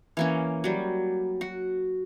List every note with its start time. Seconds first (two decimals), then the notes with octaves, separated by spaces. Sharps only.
0.17 E3 A#3 C#4
0.64 F#3 G3
1.41 F#4